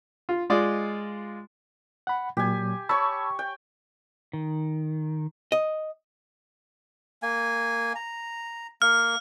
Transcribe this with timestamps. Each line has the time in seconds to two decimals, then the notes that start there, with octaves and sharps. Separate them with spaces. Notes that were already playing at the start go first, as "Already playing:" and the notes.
0.29 F4
0.50 G#3 F4 D5 D#5
2.07 F#5 B5
2.37 A#2 F#3 G4 G#5
2.89 C#5 A5 B5 C#6 E6
3.39 G5
4.33 D#3
5.52 D#5
7.23 A#3 G#5
7.95 A#5
8.82 A#3 F6